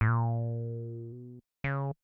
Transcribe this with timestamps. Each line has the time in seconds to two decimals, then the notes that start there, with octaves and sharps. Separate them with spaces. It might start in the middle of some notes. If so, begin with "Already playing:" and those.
0.01 A2
0.08 A#2
1.12 B2
1.64 C#3